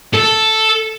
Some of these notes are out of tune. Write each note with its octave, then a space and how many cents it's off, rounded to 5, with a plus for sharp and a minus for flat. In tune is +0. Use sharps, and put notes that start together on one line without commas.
A4 +0